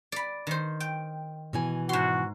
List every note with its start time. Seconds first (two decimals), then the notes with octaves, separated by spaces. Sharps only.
0.12 D5 B5
0.47 D#3 C5
0.80 G5
1.53 B2 E3 G#5
1.89 G#2 F#4 C6